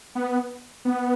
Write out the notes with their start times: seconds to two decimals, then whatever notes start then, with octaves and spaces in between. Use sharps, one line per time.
0.15 B3
0.85 B3